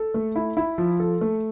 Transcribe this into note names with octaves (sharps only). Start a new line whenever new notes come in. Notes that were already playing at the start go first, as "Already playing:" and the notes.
Already playing: A4
A3
E4
E4
F3
A4
A3